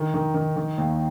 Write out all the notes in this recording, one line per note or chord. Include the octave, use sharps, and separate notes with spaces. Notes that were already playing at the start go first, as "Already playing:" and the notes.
Already playing: D#3
D#3
D#3
D#3
D#2